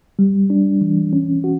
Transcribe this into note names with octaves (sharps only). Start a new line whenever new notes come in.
G3
D4
E3
C#4
F#4